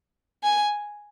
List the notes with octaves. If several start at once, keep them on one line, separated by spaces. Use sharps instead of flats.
G#5